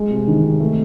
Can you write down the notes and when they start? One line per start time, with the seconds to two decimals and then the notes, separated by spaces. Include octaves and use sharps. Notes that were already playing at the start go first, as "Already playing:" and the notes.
Already playing: G#3
0.10 C3
0.28 D#3
0.43 C3
0.60 A3